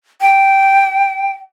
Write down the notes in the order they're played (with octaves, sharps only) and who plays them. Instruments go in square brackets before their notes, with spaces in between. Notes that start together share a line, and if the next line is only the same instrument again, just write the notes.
[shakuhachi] G5